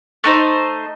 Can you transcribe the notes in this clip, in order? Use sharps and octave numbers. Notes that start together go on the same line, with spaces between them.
A3 D#4 C5